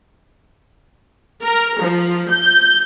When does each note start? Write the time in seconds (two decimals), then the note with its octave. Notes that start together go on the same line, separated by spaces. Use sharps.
1.44 A#4
1.83 F3
2.30 G6